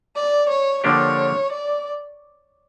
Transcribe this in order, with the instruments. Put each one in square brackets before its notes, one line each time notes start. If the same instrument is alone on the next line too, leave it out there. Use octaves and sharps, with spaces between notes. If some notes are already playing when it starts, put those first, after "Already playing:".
[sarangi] D5
C#5
[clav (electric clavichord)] D3 F3 A#3 D4 G4 [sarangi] C#5
[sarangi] D5